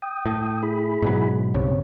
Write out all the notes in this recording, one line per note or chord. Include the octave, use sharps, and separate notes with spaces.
G5 D#6
A2
E4 G#4 B5
G#2 B2 F#3
B1 G2 C#3 C4 C#5